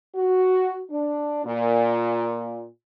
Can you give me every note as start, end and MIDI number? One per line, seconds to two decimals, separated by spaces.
0.16 0.81 66
0.90 1.44 62
1.45 2.66 46